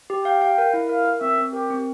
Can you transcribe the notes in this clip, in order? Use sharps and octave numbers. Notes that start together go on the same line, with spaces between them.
G4
F5 G5
F5
A#4
E4
A#4 F5
A#4
C4 E5
C4
G4 A#4
C4